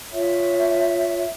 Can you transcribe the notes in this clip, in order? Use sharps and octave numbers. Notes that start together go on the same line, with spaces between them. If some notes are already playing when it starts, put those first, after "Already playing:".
F4 C#5 E5